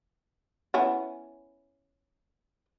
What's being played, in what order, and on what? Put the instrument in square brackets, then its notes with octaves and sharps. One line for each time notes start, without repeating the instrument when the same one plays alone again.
[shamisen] B3 C#4 E4